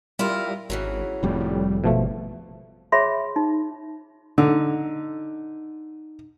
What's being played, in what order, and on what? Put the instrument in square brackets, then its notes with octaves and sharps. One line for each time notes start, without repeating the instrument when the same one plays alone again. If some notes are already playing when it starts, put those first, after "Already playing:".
[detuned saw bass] G3 [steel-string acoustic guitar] E4 F4 A#4
[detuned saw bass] G#1 [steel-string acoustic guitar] C#3 E3 F#3
[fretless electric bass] F1 F2 A2 [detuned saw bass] G3
[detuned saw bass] G#1 [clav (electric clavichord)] B2 F3 A3
[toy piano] G#4 C#5 E5 B5 C6
D#4
[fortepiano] D3 [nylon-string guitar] D#4